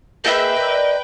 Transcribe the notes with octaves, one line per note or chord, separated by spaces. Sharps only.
A#3 G#4 B4 D#5 E5 G5 G6
A#4 D5